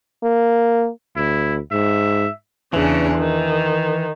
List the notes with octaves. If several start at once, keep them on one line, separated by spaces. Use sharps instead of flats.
A#3
D2 E4
G#2 E5
E2 C#3 E3 D4
D#3